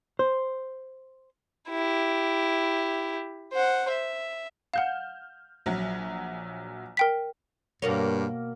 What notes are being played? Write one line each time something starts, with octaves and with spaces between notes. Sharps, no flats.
C5
E4 G4
C5 F#5
E5
F5 F#5 F6 G6 E7
A#1 F#3
A#4 G5 B6
G2 B2 A#3 C#5